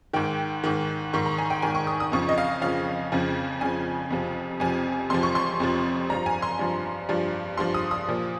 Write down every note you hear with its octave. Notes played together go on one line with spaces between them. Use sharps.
G#2 D#3 G5
G#2 D#3
G#2 D#3 C#6
A#5
G#5
G5
G#2 D#3 G#5
C#6
D#6
D#6
F2 C#3 F3 C#6
D#5
F5
F2 C#3 F3 F5
F2 C#3 F3
F2 C#3 F3 G#5
F2 C3 F3
F2 C3 F3 G#5
F2 C3 F3 C6
C#6
C6
F2 C3 F3
G2 F3 A#5
G#5
C6
G2 F3
G2 F3
G2 F3 C6
D#6
D#6
A#2 F3